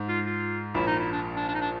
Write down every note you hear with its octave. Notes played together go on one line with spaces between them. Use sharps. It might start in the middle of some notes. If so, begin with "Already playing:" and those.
Already playing: G#2
F4
F4
A#1 A#2 E4
D#4
E4
D4
D4
D4
D#4
D4